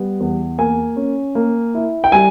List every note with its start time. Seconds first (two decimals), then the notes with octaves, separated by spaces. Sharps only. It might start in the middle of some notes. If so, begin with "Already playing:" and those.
Already playing: G3 B3
0.20 E2
0.58 A#3 G#5
0.96 C#4
1.35 A#3
1.75 E4
2.04 G5
2.12 G3 G#5